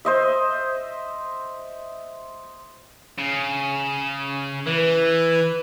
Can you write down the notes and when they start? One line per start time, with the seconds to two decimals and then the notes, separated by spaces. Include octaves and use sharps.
0.05 C5 D#5 E5
3.18 C#3
4.66 E3 B4